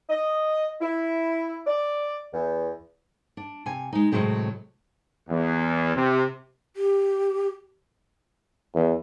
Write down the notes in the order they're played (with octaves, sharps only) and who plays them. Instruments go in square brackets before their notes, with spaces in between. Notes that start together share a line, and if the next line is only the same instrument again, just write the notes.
[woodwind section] D#5
E4
D5
E2
[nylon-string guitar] D4
C3 G#5
G#3 D#4
A2 C3 F3 F#3 G#3 C4
[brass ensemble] E2
C3
[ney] G4
[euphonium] E2